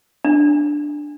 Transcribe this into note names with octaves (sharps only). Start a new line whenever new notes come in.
D4